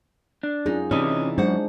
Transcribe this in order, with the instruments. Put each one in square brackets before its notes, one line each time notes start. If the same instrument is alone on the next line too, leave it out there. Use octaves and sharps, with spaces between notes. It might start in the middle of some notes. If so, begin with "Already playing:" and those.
[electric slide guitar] D4
[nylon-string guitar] F#2 D#4 [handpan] C#4 F4 G#4
[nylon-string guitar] C3 E3 [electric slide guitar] C#4 D#5 [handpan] D#4 E4 D5
[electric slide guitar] F#2 [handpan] G#3 D4 G#4 [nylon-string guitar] C5 F#5